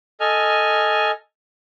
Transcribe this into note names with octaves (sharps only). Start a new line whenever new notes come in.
A4 D#5 G#5 F6